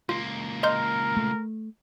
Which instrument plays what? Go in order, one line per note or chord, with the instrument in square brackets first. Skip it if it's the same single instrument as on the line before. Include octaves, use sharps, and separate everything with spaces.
[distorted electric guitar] C#2 A#3 [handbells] F4
[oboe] A#4 [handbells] D#5 C6 G6
[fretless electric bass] A3